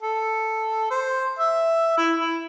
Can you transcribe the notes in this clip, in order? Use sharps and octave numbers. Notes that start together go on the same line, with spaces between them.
A4
C5
E5
E4
E4